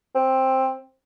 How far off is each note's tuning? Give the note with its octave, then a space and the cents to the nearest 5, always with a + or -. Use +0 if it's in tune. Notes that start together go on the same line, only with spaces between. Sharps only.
C4 +10